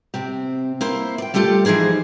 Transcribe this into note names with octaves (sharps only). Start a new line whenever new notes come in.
C3 C4
A#3 E4 C5
D5 G5
G3 A3 F4 G4 A4
E3 F3 D#4 G#4 C5